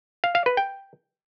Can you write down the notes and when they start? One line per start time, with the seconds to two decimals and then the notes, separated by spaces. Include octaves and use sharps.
0.24 F5
0.35 F5
0.46 B4
0.57 G5